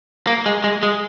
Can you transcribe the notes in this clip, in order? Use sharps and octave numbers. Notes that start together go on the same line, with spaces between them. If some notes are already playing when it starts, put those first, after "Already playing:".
A#3
G#3
G#3
G#3